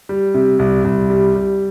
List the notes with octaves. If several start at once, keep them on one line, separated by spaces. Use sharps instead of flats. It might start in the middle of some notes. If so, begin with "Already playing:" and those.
G3
C3
C2
C2
G3
G3